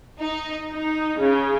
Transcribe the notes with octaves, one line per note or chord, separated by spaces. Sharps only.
D#4
D#4
C#3